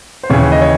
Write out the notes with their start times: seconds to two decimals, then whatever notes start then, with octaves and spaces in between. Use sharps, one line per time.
0.23 C5
0.30 D#2 C#3 E3 C#5
0.52 D#5
0.62 C#5